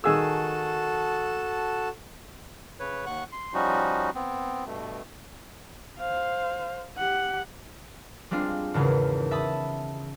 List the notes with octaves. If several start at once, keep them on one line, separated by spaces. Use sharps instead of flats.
D#3 F#4 G#4 A4 A5 E6
C#3 B4 C#5
D#2 F#5 C#6 F#6
C6
F3 G3 C#4 D#4 F#4
B3 C4
G2 B2 A3
C5 F5
G4 F#5
G3 G#3 C4 D4 F4
G#1 E2 C#3 A#4
E5 A5 B5 D#6